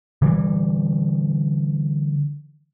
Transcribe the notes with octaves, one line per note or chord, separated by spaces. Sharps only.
D3 E3 G3